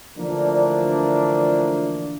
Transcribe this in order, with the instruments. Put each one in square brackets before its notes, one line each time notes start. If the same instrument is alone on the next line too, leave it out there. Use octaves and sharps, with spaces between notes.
[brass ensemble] D3 E3 F3 A3 A#3 D4